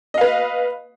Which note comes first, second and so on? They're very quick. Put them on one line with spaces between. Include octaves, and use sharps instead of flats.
D#5 F5 B4